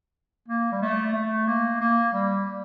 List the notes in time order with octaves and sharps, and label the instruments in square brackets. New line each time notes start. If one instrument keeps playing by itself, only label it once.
[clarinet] A#3
G3
A3
A3
A#3
A#3
G3